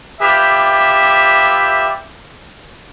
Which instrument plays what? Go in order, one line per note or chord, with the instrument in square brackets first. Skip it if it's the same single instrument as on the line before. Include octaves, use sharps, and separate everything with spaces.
[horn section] F4 G4 B4 D5 E5